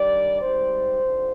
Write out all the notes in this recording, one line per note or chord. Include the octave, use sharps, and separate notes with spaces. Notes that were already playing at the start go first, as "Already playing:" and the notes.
Already playing: D#3 G3 D4 D5
G#2 G3 C4 D#4 C5
F2 D3 F3